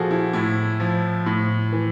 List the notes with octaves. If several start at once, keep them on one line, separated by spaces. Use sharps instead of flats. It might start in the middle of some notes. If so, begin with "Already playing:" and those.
Already playing: A#2 F3 F#4 G#4 A4
E4
A2 E4
F3
A2
E3